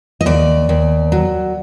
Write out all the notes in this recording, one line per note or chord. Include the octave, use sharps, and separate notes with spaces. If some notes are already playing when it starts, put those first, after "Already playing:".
D#5
D#2 D5
D#2
F#3